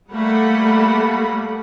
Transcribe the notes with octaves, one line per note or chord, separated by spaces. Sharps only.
G3 A3 A#3 F#5 B5